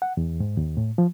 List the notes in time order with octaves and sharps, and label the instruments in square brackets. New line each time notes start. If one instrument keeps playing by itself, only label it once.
[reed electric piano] F#5
E2
G#2
D#2
A2
F3